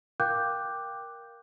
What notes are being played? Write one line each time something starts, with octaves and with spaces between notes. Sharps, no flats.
A#4 F5 G5 D6 F#6 G6